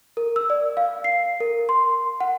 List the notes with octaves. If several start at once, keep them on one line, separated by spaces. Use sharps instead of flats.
A#4
E6
D5
F5
C7
A#4
C6
F#5